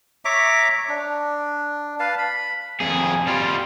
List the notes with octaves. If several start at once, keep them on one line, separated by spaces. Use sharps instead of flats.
C#5 E5 A#5 D6
D4
B4 F5 A5
B5
F2 G#4
G3 F4